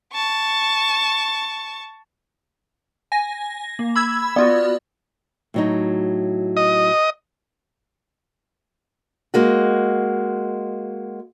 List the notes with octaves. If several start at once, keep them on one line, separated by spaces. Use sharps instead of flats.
A5 C#6
G#5 A#6
A#3
B5 E6 G#6
B3 F4 F#4 D5
A2 F#3 D#4
D#5
G#3 A#3 F#4